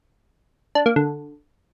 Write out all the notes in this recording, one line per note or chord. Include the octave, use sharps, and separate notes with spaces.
D4
A#3
D3